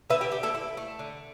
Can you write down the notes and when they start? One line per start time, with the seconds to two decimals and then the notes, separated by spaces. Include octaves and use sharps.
0.10 D3 B4 E5
0.21 G4
0.32 D3 G4
0.43 E4 A4
0.55 E4
0.77 A3
0.99 D3